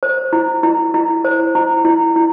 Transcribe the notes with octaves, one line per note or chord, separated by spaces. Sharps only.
C5
E4
E4
E4
C5
E4
E4
E4